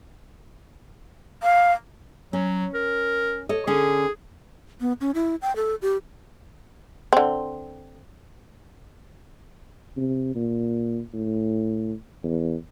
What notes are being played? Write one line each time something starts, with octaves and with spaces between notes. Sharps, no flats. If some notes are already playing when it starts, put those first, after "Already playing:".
F5
F#3 C#4
A#4
A4 C#5 D#5
D3 C#4 G#4
B3
C#4
E4
G5
A4
G4
D3 C4
C3
A#2
A2
E2